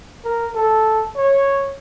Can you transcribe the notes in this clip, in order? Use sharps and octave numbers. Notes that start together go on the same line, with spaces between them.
A#4
A4
C#5